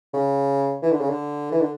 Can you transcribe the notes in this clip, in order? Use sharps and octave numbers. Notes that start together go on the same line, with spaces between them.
C#3
E3
D3
C#3
D3
E3
D3